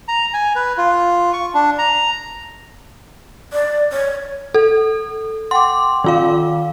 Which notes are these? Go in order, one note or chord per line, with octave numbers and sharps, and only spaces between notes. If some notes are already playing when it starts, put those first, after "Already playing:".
A#5
G#5
B4
F4
C#6
D4
A#5
D5
C#5
A4
F#5 G5 C6 D6
D#3 F4 F5